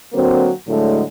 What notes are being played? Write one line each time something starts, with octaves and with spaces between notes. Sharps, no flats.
D3 F#3 A#3 C4
A2 D3 F#3 G#3 A3